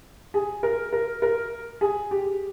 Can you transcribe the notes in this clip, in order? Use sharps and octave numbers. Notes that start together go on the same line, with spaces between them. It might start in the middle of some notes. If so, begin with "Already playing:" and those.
G#4
A#4
A#4
A#4
G#4
G4